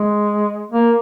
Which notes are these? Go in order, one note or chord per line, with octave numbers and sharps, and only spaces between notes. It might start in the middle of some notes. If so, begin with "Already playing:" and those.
Already playing: G#3
A#3